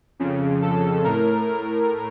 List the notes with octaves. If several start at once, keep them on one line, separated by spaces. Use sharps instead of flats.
F2 C#3
A4
A2 A#4
A#4